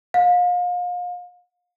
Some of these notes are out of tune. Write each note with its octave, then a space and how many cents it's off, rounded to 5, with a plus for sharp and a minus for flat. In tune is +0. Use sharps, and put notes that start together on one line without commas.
F5 +35